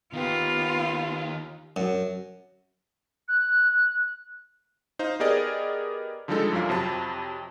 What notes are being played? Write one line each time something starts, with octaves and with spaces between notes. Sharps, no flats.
D#3 B3 F4 G4
F#2
F#6
D#4 C5 F5
B3 G4 G#4 A#4 D5 D#5
D3 F3 G3 G#3 D#4 A4
G1 F#2 F3 F5
F2 C3 F#3 A5 B5